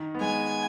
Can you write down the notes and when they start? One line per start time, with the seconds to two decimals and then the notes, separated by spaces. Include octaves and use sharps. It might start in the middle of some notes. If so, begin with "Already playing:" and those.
Already playing: D#3
0.15 B3
0.20 G#3 G#5